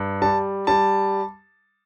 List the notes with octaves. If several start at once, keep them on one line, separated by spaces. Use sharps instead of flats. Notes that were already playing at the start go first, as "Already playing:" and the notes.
Already playing: G2
G3 A5
G3 A5